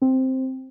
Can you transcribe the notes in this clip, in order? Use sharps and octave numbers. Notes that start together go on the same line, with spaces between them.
C4